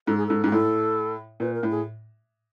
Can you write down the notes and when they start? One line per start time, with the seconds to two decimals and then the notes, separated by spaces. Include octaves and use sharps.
0.07 G#2 A4
0.17 G#4
0.27 G#2 A4
0.44 G#2 G#4
0.52 A2 A4
1.40 A#2 B4
1.55 A#4
1.63 A2
1.70 G#4